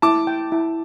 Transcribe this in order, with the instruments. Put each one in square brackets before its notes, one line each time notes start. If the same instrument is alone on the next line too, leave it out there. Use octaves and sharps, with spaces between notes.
[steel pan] E4 [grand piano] A5 D6
[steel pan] G5
E4